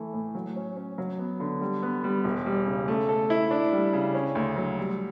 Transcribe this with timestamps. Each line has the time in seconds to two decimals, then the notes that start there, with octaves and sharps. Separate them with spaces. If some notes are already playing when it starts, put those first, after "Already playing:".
Already playing: E3 A3
0.13 A2
0.35 F#3
0.56 C#4
0.77 C#4
0.98 F#3
1.19 B3
1.40 D3
1.61 G3
1.83 B3
2.04 G3
2.24 E1
2.46 G3
2.66 C#3
2.88 A3
3.09 A4
3.30 E4
3.51 D4
3.72 G3
3.93 C#3
4.14 C#4
4.35 D2
4.57 F#3
4.78 G3